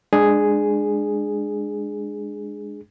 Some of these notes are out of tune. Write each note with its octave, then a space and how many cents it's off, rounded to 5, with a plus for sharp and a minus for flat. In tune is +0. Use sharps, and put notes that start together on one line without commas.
G#3 +0 D4 +25 G#4 +0